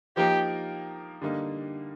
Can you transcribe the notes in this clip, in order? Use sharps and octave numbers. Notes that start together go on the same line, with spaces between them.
F3 A#3 D#4 G4 A#4
D3 G3 A#3 D#4